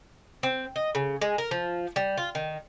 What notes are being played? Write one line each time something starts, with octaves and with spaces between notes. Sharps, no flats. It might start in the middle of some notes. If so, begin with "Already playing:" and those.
C4
D#5
C#3
G#3
A#4
F3
G3
F4
D#3